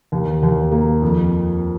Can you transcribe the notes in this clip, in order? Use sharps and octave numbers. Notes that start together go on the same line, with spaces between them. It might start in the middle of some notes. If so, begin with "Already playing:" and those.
D#2
D#2
A#3
F2